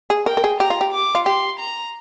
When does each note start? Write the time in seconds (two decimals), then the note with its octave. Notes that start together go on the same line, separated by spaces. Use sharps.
0.10 G#4
0.26 A#4 G5
0.37 A#4
0.44 G#4
0.60 G4 A#5
0.70 F4
0.81 G4
0.93 D6
1.15 F4
1.26 G4 C6
1.59 A#5